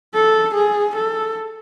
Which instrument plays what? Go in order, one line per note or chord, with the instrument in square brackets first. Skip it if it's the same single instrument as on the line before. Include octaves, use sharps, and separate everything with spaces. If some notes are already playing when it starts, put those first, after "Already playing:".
[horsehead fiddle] A4
G#4
A4